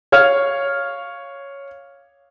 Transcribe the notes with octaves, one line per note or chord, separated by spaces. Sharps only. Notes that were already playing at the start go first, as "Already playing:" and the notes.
C#5 F5 F6 G#6